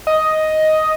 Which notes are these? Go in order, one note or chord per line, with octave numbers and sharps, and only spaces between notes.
D#5